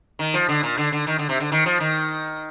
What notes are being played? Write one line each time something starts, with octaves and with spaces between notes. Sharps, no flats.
D#3
F3
D3
A#2
D3
D3
D#3
D3
C3
D3
D#3
F3
D#3